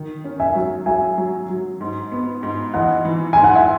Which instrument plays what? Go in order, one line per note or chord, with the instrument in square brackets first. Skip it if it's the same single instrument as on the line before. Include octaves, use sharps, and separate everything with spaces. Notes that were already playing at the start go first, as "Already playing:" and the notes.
Already playing: [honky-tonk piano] D#3
C#4
[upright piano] E5 G#5
[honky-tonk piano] F#3
[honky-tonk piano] F#3 [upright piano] E5 G#5
[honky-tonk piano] F#3
F#3
G#2
B3
G#2
[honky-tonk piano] E3 [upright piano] D#5 F#5
[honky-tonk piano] E3
[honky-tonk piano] G#2 [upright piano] G#5
[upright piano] F#5
E5 G#5